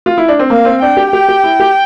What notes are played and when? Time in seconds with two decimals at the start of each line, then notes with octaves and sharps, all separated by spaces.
0.06 F4
0.18 E4
0.28 D4
0.39 C4
0.50 A#3 F5
0.65 C4
0.82 D4 G5
0.97 G4
1.12 G4 G5
1.29 G4
1.44 E4
1.60 G4